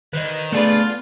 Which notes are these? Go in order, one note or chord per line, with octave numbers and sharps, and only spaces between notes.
D#3 B4 C5 D#5
A3 B3 D4 F4 G#4 B4